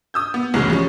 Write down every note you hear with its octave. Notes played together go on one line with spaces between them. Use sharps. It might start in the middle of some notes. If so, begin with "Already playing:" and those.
D#6 E6 G6
B3
F#1 C2 A2 C#3 E3 F#3
F3 G3 C#4